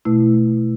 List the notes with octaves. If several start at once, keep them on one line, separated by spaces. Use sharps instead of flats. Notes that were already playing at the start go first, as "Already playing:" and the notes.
B2 A3 E4